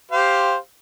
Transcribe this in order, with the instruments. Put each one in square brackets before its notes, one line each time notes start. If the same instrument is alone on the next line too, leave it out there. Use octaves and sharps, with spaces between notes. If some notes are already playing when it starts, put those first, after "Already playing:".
[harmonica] G4 C5 F5